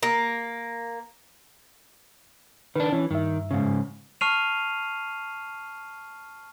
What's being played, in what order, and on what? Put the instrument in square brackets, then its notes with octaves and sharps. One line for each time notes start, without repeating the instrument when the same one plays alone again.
[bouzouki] A#3
[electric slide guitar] D#3 D4 [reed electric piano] B4
[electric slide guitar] E3 [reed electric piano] C#4
[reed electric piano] G2 E5 [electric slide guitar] D#3
[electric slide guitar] G#2 C#3
[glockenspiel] A5 C#6 F6 C7 D#7 F7